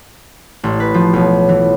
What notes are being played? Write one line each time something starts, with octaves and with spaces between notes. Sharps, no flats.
A1
B4
F3
B1
E3